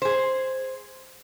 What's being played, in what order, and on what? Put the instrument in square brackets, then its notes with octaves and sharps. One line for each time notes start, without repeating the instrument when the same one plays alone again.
[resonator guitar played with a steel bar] G#4 C5